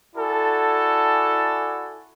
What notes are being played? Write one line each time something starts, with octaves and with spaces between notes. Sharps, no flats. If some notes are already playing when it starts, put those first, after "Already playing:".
E4 F#4 A4 D5 G#5 A5